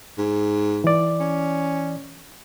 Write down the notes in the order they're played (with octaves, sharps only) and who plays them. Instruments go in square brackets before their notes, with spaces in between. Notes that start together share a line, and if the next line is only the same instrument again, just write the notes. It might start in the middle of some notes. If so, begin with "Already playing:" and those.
[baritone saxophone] G#2
[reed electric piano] E3 D5
[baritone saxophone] C#4